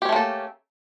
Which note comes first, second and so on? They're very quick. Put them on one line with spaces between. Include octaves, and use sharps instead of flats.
G4 C#4 A3 A#3 A4